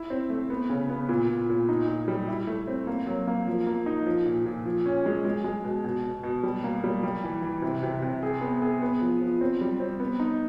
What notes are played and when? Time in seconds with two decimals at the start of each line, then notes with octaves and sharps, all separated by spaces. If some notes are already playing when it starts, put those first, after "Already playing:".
Already playing: E4
0.10 C4
0.30 A3
0.50 B3
0.69 C#3
0.89 B3
1.09 A#2
1.30 A#2
1.49 A#2
1.69 D#4
1.88 A#2
2.08 G3
2.28 E4
2.47 A3
2.67 C4
2.87 A#3
3.07 F#3
3.27 A#3
3.47 F3
3.67 A#3
3.86 D#4
4.06 F3
4.26 A#2
4.46 A#2
4.66 F3
4.86 C#4
5.06 G#3
5.25 G#3
5.44 G#3
5.65 B2
5.84 B2
6.04 B2
6.23 B2
6.43 G3
6.64 A#3
6.84 G3
7.03 G3
7.24 E3
7.42 E3
7.62 C3
7.83 C3
8.02 C3
8.23 G#4
8.41 B3
8.62 G#4
8.82 B3
9.01 F3
9.21 F3
9.41 C4
9.61 G3
9.80 C4
10.00 B3
10.20 D#4